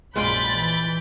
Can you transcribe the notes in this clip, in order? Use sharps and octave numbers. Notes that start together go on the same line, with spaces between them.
A#1 F#2 G#3 F4 D5 G5 B5 A6
E3